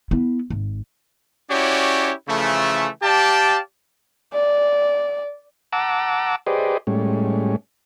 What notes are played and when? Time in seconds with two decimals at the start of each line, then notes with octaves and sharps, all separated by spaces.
0.11 B3 E4
0.50 G#1
1.50 C#4 E4 F#4 G4 C#5 D5
2.28 C#3 E3 F3 A3
3.02 G4 D5 F5 G5 A5
4.33 D5
5.73 F#5 A5 A#5 D6 E6
6.47 G4 G#4 B4 C5 D5 D#5
6.87 A2 G3 G#3 C#4